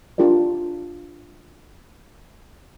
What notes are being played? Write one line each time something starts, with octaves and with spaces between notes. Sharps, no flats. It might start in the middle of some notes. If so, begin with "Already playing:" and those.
D4 F4 G4 A#4 D5